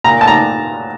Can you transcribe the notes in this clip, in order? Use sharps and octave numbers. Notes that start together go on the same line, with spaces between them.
A#2 A#5
A5
A#5